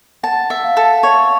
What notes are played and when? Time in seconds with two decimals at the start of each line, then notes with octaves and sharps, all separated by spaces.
0.23 F#5 A5
0.50 E5
0.63 F5
0.77 A4
1.03 C#5